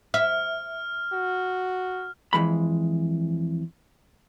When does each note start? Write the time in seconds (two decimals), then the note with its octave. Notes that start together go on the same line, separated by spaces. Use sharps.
0.14 E5 F6
1.12 F#4
2.33 F2 E3 G#3 B5